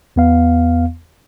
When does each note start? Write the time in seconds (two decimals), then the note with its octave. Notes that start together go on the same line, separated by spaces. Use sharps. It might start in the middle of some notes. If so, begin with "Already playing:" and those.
0.16 E2 B3 F5